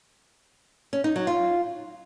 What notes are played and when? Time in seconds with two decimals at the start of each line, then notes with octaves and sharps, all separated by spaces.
0.93 C#4
1.04 D#4
1.16 F#3
1.27 F4